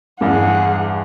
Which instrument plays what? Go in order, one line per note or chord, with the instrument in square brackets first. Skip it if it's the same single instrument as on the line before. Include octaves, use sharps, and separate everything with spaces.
[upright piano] E2 G2 F5 [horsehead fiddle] G#4 F#5